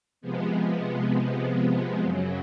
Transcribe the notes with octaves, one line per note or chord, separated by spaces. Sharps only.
C3 F3 G#3 B3
F#2 C#3 F#3